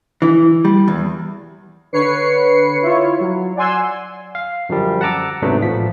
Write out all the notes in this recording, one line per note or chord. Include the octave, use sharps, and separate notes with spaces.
E3
G3
E2
D3 B4 C#5 C7 C#7
E4 F4 C#5
F#3
D5 F#5 G#5 C6 E6
F5
F#2 D3 F3 G3
F#5 A5 A#5 D6 E6
G#2 C3 F#3 A3 B3 D4
A1 F3 B6